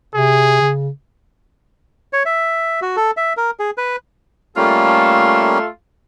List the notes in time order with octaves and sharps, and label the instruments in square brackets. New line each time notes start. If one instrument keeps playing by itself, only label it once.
[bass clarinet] C3 [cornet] G#4
[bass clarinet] C#3
[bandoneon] C#5
E5
F#4
A4
E5
A#4
G#4
B4
[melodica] G3 A#3 C#4 [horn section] A3 F4 A4